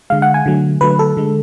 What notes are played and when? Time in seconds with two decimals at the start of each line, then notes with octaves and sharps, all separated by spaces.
0.10 D3 G#3 F5
0.22 F#5
0.34 G#5
0.46 D3 F#3 A3
0.81 D3 F#3 A3 B4
0.99 A4
1.17 D3 G#3